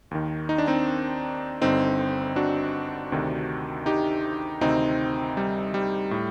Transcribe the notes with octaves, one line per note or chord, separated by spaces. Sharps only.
D#2 D#3
D#4
D4
C4 D#4
G1 G2 D3 C4 D#4
D4 F#4
D2 C3 D#3
D#4 G4
D2 C3 D#3 C4 D#4
G3
G3
A2